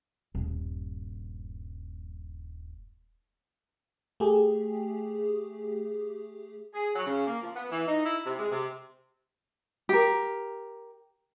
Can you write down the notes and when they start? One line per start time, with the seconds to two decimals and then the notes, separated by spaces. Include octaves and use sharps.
0.35 D#1 G2
4.20 A3 G4 G#4
6.73 G#4
6.93 F#3
7.06 C#3
7.25 A#3
7.41 F3
7.54 B3
7.69 E3
7.86 D#4
8.03 E4
8.24 C3
8.37 G#3
8.49 C3
9.89 G4 A#4